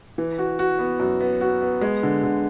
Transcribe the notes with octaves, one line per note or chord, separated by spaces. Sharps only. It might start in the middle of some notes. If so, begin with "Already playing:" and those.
E3
F#4
F#4
B3
F#2
B3
F#4
B3
G#3
D3
D3